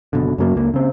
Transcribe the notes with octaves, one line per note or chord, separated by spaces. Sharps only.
F#1 B2 D3
F#2 C#3 F#3 A#3
C#2 A#3
C#3 C4